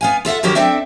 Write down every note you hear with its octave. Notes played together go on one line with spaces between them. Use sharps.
B3 F5 G#5
F4 A4 E5 F#5
D3 D#3 F#3 G4 A#4
C4 D4 A4 E5 G5